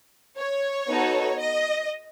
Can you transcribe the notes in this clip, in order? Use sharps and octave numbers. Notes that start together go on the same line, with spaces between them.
C#5
B3 D#4 F#4 A4
D#5